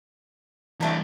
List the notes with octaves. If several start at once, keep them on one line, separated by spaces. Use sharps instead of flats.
E3 G3 A3 D4 A#5